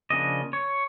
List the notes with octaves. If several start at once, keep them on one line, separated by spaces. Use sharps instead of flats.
C#3 F3 A#3 D4 D#5
C#5